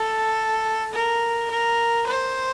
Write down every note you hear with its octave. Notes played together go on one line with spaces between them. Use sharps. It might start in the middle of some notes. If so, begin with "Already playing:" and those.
Already playing: A4
A#4
A#4
C5